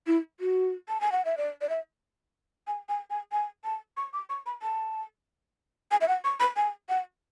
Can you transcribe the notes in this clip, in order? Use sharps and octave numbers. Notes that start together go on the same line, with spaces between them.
E4
F#4
A5
G#5
F#5
E5
D5
D5
E5
G#5
G#5
G#5
G#5
A5
C#6
D6
C#6
B5
A5
G#5
E5
F#5
C#6
B5
G#5
F#5